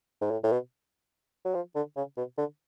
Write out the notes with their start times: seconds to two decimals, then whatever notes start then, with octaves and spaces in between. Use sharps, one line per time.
0.22 G#2
0.31 A2
0.43 A2
0.52 B2
1.45 F#3
1.55 F3
1.76 D3
1.97 C#3
2.17 B2
2.38 D3